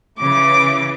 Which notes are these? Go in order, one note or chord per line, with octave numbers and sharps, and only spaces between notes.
C#3 E3 D6